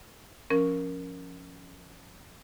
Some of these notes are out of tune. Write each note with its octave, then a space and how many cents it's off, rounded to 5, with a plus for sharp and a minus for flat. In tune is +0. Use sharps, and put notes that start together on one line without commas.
F3 +0 C#4 +0 A#4 +0